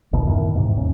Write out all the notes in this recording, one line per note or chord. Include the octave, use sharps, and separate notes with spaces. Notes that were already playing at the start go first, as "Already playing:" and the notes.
G#1 D2 B2 D#3
F#2 A2 D#3
E2 G#2 C3
D#2 C#4